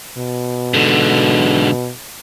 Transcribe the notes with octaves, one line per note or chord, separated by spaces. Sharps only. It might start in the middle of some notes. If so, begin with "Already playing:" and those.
B2
G#2 D3